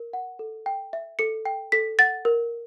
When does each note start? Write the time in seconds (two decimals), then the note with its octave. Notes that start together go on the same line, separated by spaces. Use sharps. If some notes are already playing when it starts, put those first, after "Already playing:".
Already playing: A#4
0.13 F#5
0.39 A4
0.66 G5
0.93 E5
1.19 A4 C#7
1.45 G5
1.72 A4 B6
1.99 F#5 A6
2.25 A#4